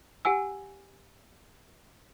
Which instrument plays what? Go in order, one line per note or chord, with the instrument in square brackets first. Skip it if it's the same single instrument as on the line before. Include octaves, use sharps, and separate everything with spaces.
[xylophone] G4 F#5 G#5 E6